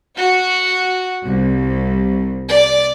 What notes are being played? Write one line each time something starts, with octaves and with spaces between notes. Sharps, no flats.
F#4
C2
D5